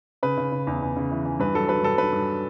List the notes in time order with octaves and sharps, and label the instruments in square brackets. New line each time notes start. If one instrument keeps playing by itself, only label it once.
[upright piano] C#3 B4
C#3
C#3
E2
E2
C#3
E3
E3
G2 B4
F#3 A4
F#3 B4
G2 A4
G2 B4
G2